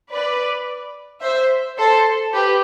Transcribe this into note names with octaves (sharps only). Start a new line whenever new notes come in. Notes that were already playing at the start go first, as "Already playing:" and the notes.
B4 D5
C5 E5
A4 C5
G4 B4